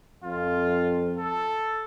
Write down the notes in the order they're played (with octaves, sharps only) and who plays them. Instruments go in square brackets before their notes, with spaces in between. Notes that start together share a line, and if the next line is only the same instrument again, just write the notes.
[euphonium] F2 [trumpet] F4
[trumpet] A4